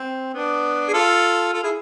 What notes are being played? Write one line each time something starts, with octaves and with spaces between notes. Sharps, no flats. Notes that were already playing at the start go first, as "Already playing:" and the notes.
Already playing: C4
B3 D4
G#4
F4 A4
F4 A4
E4 G#4